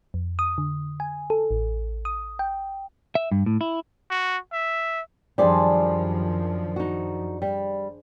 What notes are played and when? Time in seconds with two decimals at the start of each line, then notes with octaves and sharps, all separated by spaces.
0.14 F2
0.39 D#6
0.58 D3
1.00 G#5
1.30 A4
1.51 A1
2.05 D#6
2.39 G5
3.15 E5
3.31 G2
3.46 A2
3.61 E4
4.10 F#4
4.53 E5
5.38 F#2 D#3 F3 G3 D4 G#4 C5 D5
6.76 D#4 F#4
7.42 G3